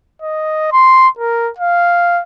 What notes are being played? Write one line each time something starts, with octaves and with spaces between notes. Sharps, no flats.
D#5
C6
A#4
F5